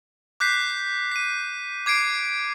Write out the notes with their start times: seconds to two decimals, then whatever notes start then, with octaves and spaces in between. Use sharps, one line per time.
0.40 D6 F#6 G6 B6 C7
1.12 B6 D#7
1.86 D6 G#6 C7 D7